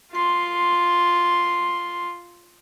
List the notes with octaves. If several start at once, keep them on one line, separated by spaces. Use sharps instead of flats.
F4 C6